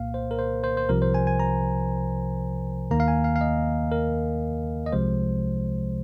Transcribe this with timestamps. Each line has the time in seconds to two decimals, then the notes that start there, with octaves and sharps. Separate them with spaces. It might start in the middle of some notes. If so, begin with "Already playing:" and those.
Already playing: C2 A#2 A#3 F5
0.14 C5
0.31 A#4
0.39 C5
0.64 C5
0.77 C5
0.89 C2 C3 F3 A#4
1.02 C5
1.14 G#5
1.27 G#5
1.40 A#5
2.91 D#2 D#3 A#3 A#5
3.00 F5
3.08 G#5
3.24 F5
3.36 F5
3.41 D#5
3.92 A#4
4.86 D#5
4.92 C2 C3 F3 G#3 C5